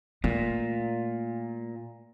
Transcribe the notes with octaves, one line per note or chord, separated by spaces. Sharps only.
A#2 A3